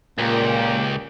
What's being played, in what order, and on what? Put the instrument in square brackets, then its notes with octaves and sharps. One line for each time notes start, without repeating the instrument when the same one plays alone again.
[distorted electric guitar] C#2 [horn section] A#2 [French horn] A#3 [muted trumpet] G4